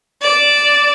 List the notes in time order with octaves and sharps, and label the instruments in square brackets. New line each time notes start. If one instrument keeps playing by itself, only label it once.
[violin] D5 E7